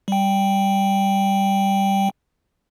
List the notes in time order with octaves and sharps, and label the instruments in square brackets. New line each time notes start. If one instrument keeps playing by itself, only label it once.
[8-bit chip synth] G3 G5